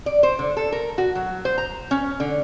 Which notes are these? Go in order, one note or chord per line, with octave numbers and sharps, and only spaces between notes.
D5
C5
D3
A4
A#4
F#4
F#3
C5
A#5
C#4
D3